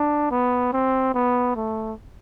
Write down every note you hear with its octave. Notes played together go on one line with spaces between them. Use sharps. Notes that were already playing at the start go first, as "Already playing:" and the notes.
Already playing: D4
B3
C4
B3
A3